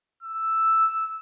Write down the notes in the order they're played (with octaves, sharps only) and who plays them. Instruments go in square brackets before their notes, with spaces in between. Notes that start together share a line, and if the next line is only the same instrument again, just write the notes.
[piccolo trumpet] E6